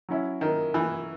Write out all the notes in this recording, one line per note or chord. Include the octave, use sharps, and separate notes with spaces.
F#3 C#4 E4
D#3
E3